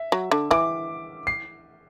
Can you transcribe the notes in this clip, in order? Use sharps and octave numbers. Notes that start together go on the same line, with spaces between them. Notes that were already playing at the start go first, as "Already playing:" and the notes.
Already playing: E5
F#3
D3
E3 D6
C7